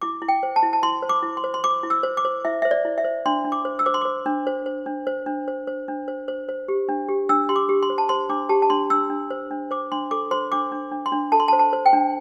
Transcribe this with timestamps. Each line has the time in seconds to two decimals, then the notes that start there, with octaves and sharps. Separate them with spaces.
0.02 E4 D6
0.22 E4
0.28 G5
0.43 C5
0.56 A5
0.63 E4
0.73 A5
0.83 E4 C6
1.02 C5
1.09 D6
1.23 E4
1.37 C6
1.44 C5
1.54 C6
1.64 C5 D6
1.83 E4
1.90 E6
2.03 C5
2.17 D6
2.25 C5
2.45 E4 E5
2.62 C5 E5
2.71 D5
2.85 E4
2.98 E5
3.04 C5
3.26 D4 C6
3.45 D4
3.52 D6
3.65 C5
3.79 E6
3.86 C5 D6
3.94 C6
4.01 C5 D6
4.26 D4
4.47 C5
4.66 C5
4.86 D4
5.07 C5
5.26 D4
5.48 C5
5.67 C5
5.88 D4
6.08 C5
6.28 C5
6.49 C5
6.68 G4
6.89 D4
7.09 G4
7.29 D4 E6
7.49 G4 C6
7.56 D6
7.69 G4
7.83 C6
7.90 C5
7.98 A5
8.09 C5 C6
8.29 D4 D6
8.49 G4 A5
8.62 A5
8.70 D4 C6
8.90 D4 E6
9.10 D4
9.30 C5
9.51 D4
9.71 C5 D6
9.92 D4 C6
10.11 A4 D6
10.31 C5 C6
10.52 D4 D6
10.72 D4
10.92 D4
11.06 C6
11.12 D4
11.32 A4 A5
11.40 C6
11.48 A5
11.53 C5
11.59 A5
11.73 C5
11.86 G5
11.93 D4